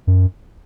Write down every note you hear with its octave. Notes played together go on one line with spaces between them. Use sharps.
F#2